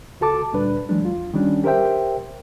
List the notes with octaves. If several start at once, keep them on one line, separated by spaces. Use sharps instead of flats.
C#2 F#4 A4 A5 D6
D2 A#2 G3 D4 B4
E3 F#3 G#3 D4
D#2 F4
D#3 G3 C#4 D4
G4 A#4 C5 E5 G5